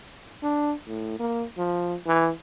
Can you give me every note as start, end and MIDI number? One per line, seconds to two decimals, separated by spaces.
0.43 0.73 62
0.88 1.15 45
1.19 1.44 58
1.58 1.94 53
2.07 2.30 52